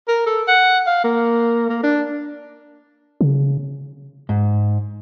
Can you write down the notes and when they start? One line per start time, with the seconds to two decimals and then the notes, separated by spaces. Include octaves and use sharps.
0.08 A#4
0.26 A4
0.48 F#5
0.87 F5
1.04 A#3
1.69 A#3
1.83 D4
3.21 C#3
4.29 G#2